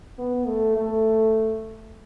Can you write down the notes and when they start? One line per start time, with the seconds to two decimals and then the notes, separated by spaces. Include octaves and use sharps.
0.18 B3
0.46 A3
0.77 A3